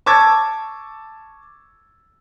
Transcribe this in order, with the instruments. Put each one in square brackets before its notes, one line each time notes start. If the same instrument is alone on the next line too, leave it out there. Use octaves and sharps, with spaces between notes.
[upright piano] A5 C#6 D6 E6 G#6 A6